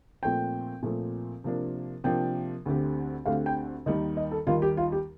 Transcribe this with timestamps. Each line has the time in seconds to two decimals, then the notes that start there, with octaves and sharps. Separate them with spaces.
0.23 A#2 F3 A3 C4 G5
0.83 A#2 F3 A3 C4
1.44 C3 F3 A#3 D4
2.04 C3 F3 A#3 D4 G5
2.65 D2 D3 A3 C4 G4
3.25 D2 D3 A3 C4 G4 F5
3.46 G5
3.86 D#2 D#3 G3 A#3 D#4 D#5
4.17 D#5
4.32 A4
4.46 D#2 D#3 G3 A#3 D#4 F4
4.62 G4
4.77 F4
4.92 G4